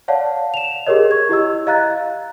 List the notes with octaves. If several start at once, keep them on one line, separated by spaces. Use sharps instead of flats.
C#5 D5 F5 F#5 A5
E7 F7
G4 G#4 A#4 C#5 D#5
C#6 G#6
E4 G4 D#5 E6
D#5 F5 A#5 F#6 A6